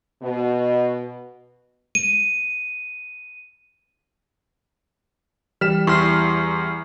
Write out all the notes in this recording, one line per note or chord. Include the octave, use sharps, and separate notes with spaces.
B2
D#7
E3 G3 F6 B6 E7
E2 E4 C6 C#6 F6 C7